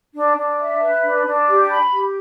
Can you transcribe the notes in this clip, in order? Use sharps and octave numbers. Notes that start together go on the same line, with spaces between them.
D4
D4
E5
B4
D4
D4
G4
B5
G4